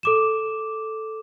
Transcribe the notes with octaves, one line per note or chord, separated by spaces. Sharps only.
A4 D6 E7